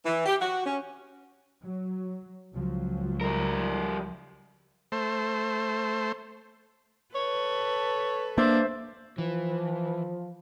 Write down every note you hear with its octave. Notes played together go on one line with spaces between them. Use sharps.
E3
G4
F#4
C#4
F#3
C#2 F3 F#3
G3 A#4
A3 C5
A4 B4 C#5
A#3 D4 C5 E5
E3 F3